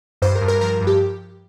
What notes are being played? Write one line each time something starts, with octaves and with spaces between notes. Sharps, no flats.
G2 C5
A#4
G2
A#4
F3 A#4
G2
G4